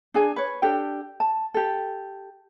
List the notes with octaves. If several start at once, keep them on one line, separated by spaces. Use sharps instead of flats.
D4 G#4 G#5
B4 C#5
D4 G4 A4 G5
A5
G4 A4